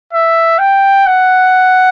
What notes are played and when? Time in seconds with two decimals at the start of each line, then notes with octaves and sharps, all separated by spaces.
0.14 E5
0.59 G5
1.07 F#5